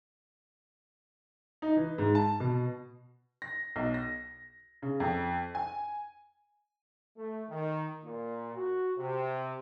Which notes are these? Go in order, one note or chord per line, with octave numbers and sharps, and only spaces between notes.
D#4
E3
G#2
A5
B2
A#6
B1
A#6
C#3
F2
G#5
A3
D#3
A#2
F#4
C3